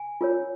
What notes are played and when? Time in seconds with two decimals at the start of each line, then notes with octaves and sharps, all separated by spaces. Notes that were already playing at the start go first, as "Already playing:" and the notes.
Already playing: G#5
0.21 F4 A#4 C#5